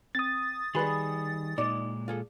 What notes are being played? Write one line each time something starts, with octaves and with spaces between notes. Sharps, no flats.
C4 D#6 A6
D#3 G3 G#4 B4 C6
A#2 G#3 D#4 D5
F4 G#4 A4